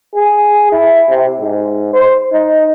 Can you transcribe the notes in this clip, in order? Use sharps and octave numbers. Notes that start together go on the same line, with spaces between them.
G#4
E4
C3
G#2
C5
D#4